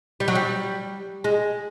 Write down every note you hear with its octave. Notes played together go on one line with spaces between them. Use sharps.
G3
F#3
G3
G#3